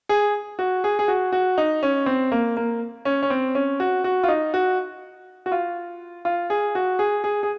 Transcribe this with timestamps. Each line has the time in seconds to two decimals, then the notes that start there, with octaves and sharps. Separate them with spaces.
0.09 G#4
0.59 F#4
0.84 G#4
0.99 G#4
1.08 F#4
1.32 F#4
1.58 D#4
1.83 C#4
2.06 C4
2.32 A#3
2.57 A#3
3.05 C#4
3.23 C#4
3.30 C4
3.55 C#4
3.80 F#4
4.04 F#4
4.23 F4
4.28 D#4
4.54 F#4
5.46 F#4
5.52 F4
6.25 F4
6.50 G#4
6.75 F#4
6.99 G#4
7.24 G#4
7.43 G#4